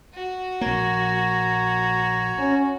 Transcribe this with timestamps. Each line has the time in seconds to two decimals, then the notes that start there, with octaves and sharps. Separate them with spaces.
0.14 F#4
0.61 A#1 A#3 C#5 A#5
2.39 C#4